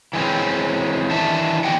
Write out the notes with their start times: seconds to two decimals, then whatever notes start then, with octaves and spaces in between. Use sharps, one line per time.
0.13 E3 G#3 C4 C#4
1.11 D#3 E3 D4 E5 A5
1.64 B3 C#4 G4 D#5 F#5 G5